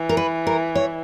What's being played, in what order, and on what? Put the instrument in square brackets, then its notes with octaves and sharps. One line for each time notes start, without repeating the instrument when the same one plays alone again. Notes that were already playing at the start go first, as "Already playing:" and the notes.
Already playing: [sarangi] E3
[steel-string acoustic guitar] A#4
B4
A#4
C#5